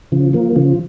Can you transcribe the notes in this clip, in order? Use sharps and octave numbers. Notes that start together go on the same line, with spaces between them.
C#3 F3
F3 A#3
C#3 F3